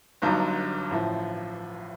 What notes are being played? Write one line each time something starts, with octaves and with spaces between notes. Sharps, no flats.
G1 G2 D3 F#3 D#4
A1 A2 F3